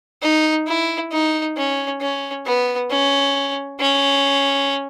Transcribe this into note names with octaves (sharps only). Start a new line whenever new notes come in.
D#4
E4
D#4
C#4
C#4
B3
C#4
C#4